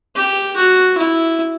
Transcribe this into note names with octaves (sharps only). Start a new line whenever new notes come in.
G4
F#4
E4